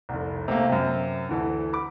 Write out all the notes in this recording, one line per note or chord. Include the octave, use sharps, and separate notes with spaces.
F1 C2
C3 A3 A#3
F#2 C3
D2 E3 A4
B5 D6